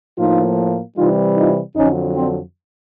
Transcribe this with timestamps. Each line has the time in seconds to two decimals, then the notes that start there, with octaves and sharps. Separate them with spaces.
0.18 A2 F3 A#3 D#4 F4
0.97 C3 E3 G3 D#4 F4
1.37 D#4 F4
1.76 F2 D3 F#3 C#4 D#4
2.15 C4 D4